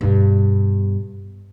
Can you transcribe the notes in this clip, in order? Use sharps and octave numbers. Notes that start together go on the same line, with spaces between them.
G2 B2